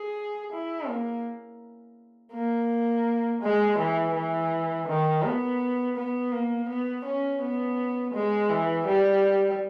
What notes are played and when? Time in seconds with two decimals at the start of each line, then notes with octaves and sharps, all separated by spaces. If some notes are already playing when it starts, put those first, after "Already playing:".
Already playing: G#4
0.52 E4
0.88 A#3
2.33 A#3
3.42 G#3
3.78 E3
4.15 E3
4.87 D#3
5.23 B3
5.96 B3
6.32 A#3
6.69 B3
7.05 C#4
7.42 B3
8.14 G#3
8.50 E3
8.87 G3